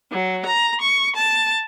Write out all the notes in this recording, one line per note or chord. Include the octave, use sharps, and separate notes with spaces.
F#3
A#5
C#6
A5